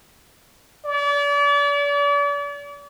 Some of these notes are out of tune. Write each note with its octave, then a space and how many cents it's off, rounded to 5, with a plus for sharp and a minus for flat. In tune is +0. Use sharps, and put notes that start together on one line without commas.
D5 -40